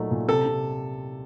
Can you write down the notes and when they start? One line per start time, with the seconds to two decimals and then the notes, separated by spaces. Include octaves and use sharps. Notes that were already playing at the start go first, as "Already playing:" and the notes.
Already playing: A#2 F#3 A3 D#4
0.11 A#2
0.28 C3 A4
0.46 C3